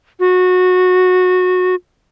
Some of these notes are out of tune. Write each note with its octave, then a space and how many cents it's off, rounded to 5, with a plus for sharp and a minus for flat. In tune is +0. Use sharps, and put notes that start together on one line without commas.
F#4 -20